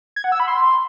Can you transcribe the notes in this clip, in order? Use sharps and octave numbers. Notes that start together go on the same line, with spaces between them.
G#6
F#5
E6
B5
C6